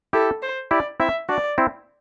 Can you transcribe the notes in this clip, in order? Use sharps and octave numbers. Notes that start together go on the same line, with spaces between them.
E4 G4 A4
C5
E4 G4 D5
C4 E4 E5
D4 F#4 D5
C4 E4